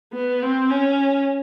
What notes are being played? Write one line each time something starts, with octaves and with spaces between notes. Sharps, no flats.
B3
C4
C#4